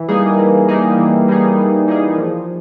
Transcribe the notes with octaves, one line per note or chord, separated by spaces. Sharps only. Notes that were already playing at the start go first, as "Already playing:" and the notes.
Already playing: E3
G3 A#3 D#4 G#4
E3
G3 A#3 D#4 G#4
E3
G3 A#3 D#4 G#4
E3
G3 A#3 D#4 G#4
F3